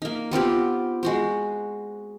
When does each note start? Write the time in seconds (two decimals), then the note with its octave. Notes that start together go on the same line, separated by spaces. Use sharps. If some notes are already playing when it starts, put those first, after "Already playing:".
0.02 A#3 D#4
0.31 B3 C4 F4 G4
1.03 G#3 F#4 C5